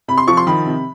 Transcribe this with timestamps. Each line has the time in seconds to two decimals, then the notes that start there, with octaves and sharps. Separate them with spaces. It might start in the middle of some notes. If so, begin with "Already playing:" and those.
0.08 C3 B5
0.18 C6
0.27 F3 C#6
0.37 C6
0.47 D#3 B5
0.66 C3